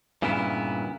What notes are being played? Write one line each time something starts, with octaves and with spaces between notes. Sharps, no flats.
G2 A#2 C#3 B3 E4